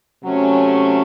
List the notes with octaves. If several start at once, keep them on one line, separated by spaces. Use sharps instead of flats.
C3 F#3 A3 C#4